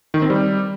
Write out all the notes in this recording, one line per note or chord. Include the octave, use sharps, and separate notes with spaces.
D#3
C4
G3